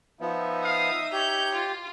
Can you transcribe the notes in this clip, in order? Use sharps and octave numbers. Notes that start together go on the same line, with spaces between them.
F3 B3 D#4 E5
F5 D#6
G4 C#5 G6 F7
F4